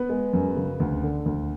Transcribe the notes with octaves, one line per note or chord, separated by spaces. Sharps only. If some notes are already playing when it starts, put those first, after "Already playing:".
Already playing: B3 B4
G#3
F#2
C#3
D2
D3
D2